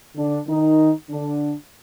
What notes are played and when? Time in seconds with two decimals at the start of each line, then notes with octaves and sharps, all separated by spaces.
0.15 D3 D4
0.47 D#3 D#4
1.09 D3 D4